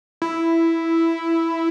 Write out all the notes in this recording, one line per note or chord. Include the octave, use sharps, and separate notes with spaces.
E4